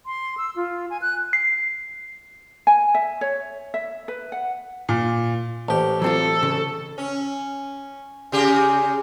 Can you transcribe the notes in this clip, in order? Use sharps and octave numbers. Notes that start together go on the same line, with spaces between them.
C6
E6
F4
G#5
F#6
C7
G#5
E5
C#5
E5
B4
F#5
A#2
A1 G4 C5 A5
F#3 C4 F4 A4
C#3
C#4
C#3 G4 G#4